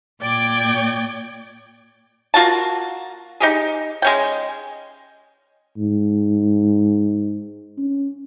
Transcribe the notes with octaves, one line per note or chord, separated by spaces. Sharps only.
A#2 D5 G5 D6 G#6
A#3 F4 F#4 A5
D#4 G4 G#4
G#3 C#4 G5
G#2
C#4